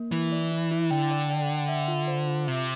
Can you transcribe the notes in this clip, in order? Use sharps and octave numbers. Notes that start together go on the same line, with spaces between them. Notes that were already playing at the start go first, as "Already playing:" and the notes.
Already playing: A#3
E3 E4
D5
E4
E4
D3 G5
D5
G5
G5
E5
F4
C5
F4
C3 E5